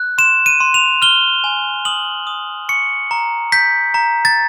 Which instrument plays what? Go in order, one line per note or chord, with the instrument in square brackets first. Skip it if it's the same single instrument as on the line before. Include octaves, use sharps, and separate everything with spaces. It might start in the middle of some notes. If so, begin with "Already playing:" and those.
Already playing: [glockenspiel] F#6
C6 E7
D#7
C6
F7
F6 G7
G#5
D#6 F#7
D#6
C#6 C#7
A#5
G6 B6
A#5
A6